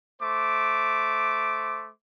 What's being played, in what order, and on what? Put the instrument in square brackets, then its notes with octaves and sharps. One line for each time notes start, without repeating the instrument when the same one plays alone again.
[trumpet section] A3 C5 D6